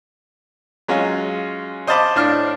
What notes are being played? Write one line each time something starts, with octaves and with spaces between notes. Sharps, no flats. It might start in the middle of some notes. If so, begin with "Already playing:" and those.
F#3 G#3 C#4 F4
C5 D#5 F5 A5 B5 D6
A2 D4 F5 F6